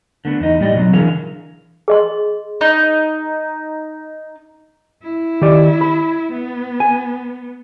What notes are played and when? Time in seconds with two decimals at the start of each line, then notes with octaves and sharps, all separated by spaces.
0.25 D3 A3 B3
0.40 E2 D#4
0.60 A2 G3 D5 D#5
0.75 B2 F#3 C4
0.93 D3 E3 G#4 A#4 F5
1.88 G#4 D#5 C6
2.61 D#4
5.03 E4
5.41 D#3 G4 D5
5.81 B5
6.32 B3
6.80 G#5